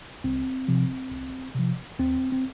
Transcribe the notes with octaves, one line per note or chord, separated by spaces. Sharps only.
C2 C4
C3 F3
C2
C3 F3
D#2 C4
C4